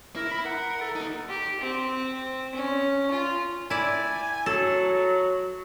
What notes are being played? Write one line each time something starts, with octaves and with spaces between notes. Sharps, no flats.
E4 A#4
B5
A#4 F#5
A4
A#3 D#4
G4
C4
C#4
F4
E4 D5 G#5
F#3 A4